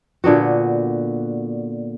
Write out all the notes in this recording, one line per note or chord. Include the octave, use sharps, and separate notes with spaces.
A#2 D3 B3 F#4